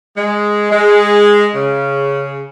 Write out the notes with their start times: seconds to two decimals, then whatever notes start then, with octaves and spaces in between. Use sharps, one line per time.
0.16 G#3
0.71 G#3
1.55 C#3